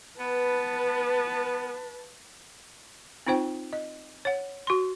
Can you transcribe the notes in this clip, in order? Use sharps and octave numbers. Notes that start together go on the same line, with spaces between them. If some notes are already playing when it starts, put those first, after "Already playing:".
B3 B4 A5
C4 D#4 F4 C5 G5
D#5
C#5 F#5
F#4 C6